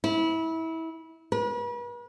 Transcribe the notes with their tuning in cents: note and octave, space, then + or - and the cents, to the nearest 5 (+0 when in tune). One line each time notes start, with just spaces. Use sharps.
E4 -25
B4 -40